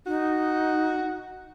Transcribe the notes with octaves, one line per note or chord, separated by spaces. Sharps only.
D#4 F#4